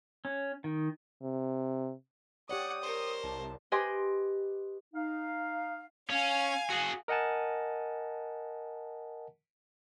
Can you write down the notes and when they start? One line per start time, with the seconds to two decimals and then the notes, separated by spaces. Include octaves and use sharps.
0.25 C#4
0.64 D#3
1.22 C3
2.49 G4 C#5 D5 F#5 D#6
2.83 A#4 C5
3.24 C2 A5
3.72 G4 B4 D#5 G#5 C6
4.94 D#4 F5
6.10 C#4 F5 G#5
6.70 F#4 G#4
7.08 A#4 D#5 F#5 G#5 A5